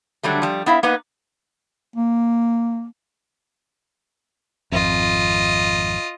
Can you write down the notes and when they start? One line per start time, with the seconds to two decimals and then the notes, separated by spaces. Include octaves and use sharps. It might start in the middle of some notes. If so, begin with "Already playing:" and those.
0.23 D3 F#3 G3 A3
0.42 F3 G3
0.66 B3 E4 E5 F5
0.83 A#3 B3 D#4 B4
1.96 A#3
4.72 G#1 F2 F4 D#5